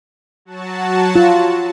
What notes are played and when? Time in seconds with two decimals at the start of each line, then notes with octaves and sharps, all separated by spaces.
0.45 F#3 F#4 A5
1.16 F4